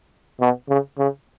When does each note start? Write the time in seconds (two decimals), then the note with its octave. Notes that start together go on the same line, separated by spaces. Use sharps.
0.40 B2
0.69 C#3
0.99 C#3